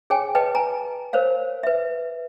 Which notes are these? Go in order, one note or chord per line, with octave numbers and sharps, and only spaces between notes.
G#4 C#5 G5 G#5
B4 D#5 G5 A5
G#5 A#5
A#4 C5 C#5 F5
B4 E5